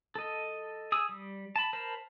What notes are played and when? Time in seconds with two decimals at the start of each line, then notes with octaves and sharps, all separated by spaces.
0.15 A4 D#5
0.92 G#4 D#6 E6
1.09 G3
1.56 A5 B5
1.73 A#4 C5 A5 B5